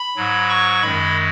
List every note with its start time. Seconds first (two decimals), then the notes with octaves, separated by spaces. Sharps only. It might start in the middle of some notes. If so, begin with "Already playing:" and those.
Already playing: B5
0.16 G#2 F#3
0.49 C#6
0.82 F#2 D#3 G#3 B5